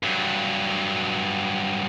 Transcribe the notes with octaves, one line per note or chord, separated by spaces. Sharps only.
G2 F#3